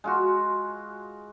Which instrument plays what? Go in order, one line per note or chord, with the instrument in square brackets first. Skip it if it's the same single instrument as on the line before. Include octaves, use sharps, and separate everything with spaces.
[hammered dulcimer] G#3 F4 F#4